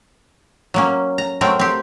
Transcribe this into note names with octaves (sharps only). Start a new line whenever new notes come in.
F#3 A#3 C#4
A#5
F#3 A3 C4 A#4 G5
C4 G4